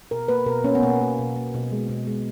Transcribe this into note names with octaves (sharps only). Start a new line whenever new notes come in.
B2 A#4
A#3 B4
B2 A#4
A#3 C#4
B3
B2 A#3
A#3
B2
A#3
B2
G#3
B2
G#3